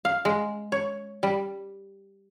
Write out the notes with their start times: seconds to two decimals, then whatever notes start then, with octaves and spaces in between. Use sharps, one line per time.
0.05 F5
0.25 G#3
0.72 C#5
1.23 G3